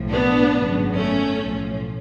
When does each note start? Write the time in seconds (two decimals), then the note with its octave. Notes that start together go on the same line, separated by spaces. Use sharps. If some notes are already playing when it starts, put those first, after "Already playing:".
Already playing: B1 A2 F3
0.11 B3 D4
0.53 G#1 F#2 C#3 F#3
0.96 A3 C#4
1.39 B1 A2 F3